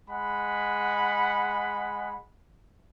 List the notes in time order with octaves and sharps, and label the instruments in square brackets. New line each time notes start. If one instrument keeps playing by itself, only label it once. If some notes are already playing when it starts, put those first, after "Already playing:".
[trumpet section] G#3 F#5 B5